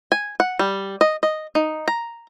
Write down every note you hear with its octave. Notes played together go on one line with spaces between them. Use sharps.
G#5
F#5
G3
D#5
D#5
D#4
A#5